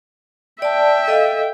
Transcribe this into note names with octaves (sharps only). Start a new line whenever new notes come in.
D5 E5 G5 A5
A4 D#5 F5